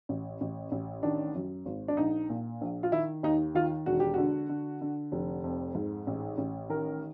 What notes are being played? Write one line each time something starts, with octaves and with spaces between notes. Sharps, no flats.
A1
A1
A1
D#3 D4
F#2
G#1
D4
A#1 D#4
A#2
A#1
F4
D#3 E4
D#2 D#4
D#3 F4
E1 F#4
G4
D3 F#4
D3
D3
F1
F2
G#2
A1
A1
D#3 A#4